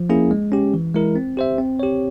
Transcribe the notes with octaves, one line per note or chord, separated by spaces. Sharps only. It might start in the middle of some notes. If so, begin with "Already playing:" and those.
Already playing: F3
A#3 C#4 E4 G#4
G#3
C#4 G4
E3
G#3 E4 A#4
C4
G4 C5 E5
C4
G4 C#5